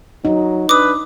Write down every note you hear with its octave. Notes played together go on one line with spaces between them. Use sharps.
F#3 D#4
D4 B4 D6 D#6